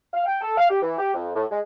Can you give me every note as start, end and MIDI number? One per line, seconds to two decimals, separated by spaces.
0.13 0.23 77
0.26 0.38 79
0.41 0.57 69
0.58 0.67 77
0.70 0.79 67
0.81 0.95 52
0.98 1.11 67
1.14 1.30 41
1.36 1.45 45
1.51 1.59 56